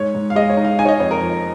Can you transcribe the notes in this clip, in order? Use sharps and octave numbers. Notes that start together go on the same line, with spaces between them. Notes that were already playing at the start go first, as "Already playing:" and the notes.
Already playing: G#2 C#5
G#2
F5
G#3 D#5
C#5
D#4
F5
D#4 G#5
C#5
D#5
F2 C#5
A#4
F3